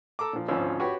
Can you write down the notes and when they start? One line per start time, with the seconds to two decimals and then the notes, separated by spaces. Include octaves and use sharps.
0.19 A4 A#5 D6
0.33 A#2 F3
0.48 G#1 D2 F3 C#4 C#5 E6
0.80 F#4 G4 B4 C#5